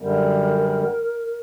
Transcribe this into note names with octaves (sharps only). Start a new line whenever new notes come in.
F#2 D3 G3 A#4